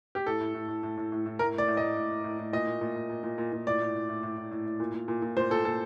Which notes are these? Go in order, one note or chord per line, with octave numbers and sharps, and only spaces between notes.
G4
A2 A4
A2
A2
A2
A2
A2
A2
A2
A2 A#4
A2 D5
A2
D#5
A2
A2
A2
A2
A2
A#2 D#5
A#2
A#2
A#2
A#2
A#2
A#2
A#2
A2 D5
A2
A2
A2
A2
A2
A2
A2
A#2
A#2
A#2
A#2
A#2 C5
A#2 A4
A#2 A4